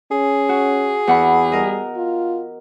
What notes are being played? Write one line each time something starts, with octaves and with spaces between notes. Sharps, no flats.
C#4 G#4
F#4
E2 F#5 B5
G3 A#4 D#5
F4